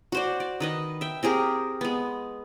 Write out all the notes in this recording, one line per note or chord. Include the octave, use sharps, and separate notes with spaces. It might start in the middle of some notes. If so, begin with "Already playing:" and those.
F#4 C5 D5
D5
D#3 B4 D#5
E5 G5
C4 G4 G#4 A#4
G#3 B3